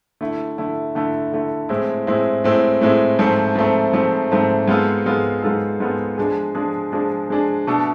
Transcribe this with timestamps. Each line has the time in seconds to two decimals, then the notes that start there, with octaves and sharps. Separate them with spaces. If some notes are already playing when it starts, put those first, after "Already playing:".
0.21 D3 A3 E4
0.58 D3 A3 E4
0.95 D3 A3 E4
1.32 D3 A3 E4
1.69 A2 G#3 C4 E4
2.07 A2 G#3 C4 E4
2.44 A2 G#3 C4 E4
2.81 A2 G#3 C4 E4
3.19 G#2 F3 A3 C4
3.56 G#2 F3 A3 C4
3.93 G#2 F3 A3 C4
4.31 G#2 F3 A3 C4
4.68 G#2 G#3 B3 F4 A4
5.05 G#2 G#3 B3 F4 A4
5.42 G#2 G#3 B3 F4 A4
5.80 G#2 G#3 B3 F4 A4
6.18 F3 G#3 D4 G#4
6.55 F3 G#3 D4 G#4
6.92 F3 G#3 D4 G#4
7.30 F3 G#3 D4 G#4
7.67 B2 A3 D4 A4